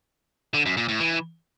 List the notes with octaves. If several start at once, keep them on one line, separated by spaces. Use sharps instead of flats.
D3
F#2
A#2
A2
E3